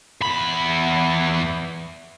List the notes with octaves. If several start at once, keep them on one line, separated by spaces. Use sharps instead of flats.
E2 B5